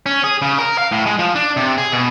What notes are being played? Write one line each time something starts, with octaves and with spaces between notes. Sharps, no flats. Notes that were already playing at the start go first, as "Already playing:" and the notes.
C#4
G#4
C#3
A#4
F5
A2
G#3
F3
D4
C3
G#4
B2